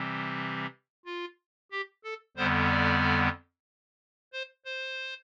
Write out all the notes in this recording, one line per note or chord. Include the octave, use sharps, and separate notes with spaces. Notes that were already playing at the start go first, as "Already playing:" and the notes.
Already playing: C3 E3 G3 C4
F4
G4
A4
F2 D3 G3 B3 C5
D5
C5
C5